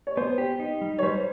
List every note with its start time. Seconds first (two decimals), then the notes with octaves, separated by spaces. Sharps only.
0.07 C#5
0.17 B3 C5
0.38 G4
0.60 D#4
0.81 G3
0.99 C#5
1.03 G3 C5